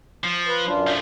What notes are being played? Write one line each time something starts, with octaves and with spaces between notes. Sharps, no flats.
F3
B4
F#2 D4 F4
F3 A3